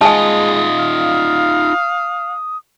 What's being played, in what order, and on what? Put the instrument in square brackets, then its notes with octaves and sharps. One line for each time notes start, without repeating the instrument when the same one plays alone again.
[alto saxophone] G#3 [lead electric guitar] D#4 F4 [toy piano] G#5 A5 [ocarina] D#6
[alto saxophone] F5